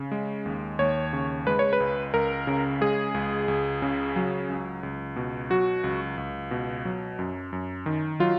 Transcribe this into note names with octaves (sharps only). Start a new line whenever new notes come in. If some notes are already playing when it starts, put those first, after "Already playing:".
Already playing: C#3
G#3
D#2
D#2 C#5
C#3
G#3 B4
C#5
B4
C#2
C#2 A#4
C#3
G#3 G#4
C#2
C#2
C#3
F#3
C#2
C#2
B2
F#3 F#4
C#2
C#2
B2
F#3
F#2
F#2
D#3
F#3 F4